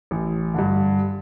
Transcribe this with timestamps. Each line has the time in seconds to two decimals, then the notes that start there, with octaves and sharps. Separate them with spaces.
0.11 A1
0.54 G2 D3